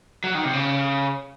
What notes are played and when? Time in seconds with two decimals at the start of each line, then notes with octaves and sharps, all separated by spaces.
0.24 F#3
0.35 D#3
0.45 C3
0.53 C#3